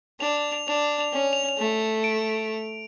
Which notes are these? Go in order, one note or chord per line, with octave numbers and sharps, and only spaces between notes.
D4 F7
F7
F7
D4 F7
F7
F7
C#4 F7
F7
F7
A3
D7